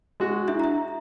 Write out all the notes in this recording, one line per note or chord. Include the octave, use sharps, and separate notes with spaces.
G#3 F#4
D4 E4 E5
E5 A#5